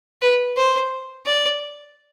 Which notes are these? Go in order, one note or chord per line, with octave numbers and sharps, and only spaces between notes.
B4
C5
D5